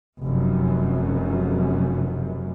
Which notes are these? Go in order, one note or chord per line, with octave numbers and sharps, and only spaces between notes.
F1 F#2